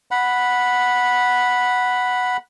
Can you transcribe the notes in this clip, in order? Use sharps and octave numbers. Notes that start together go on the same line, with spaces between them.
F#5 B5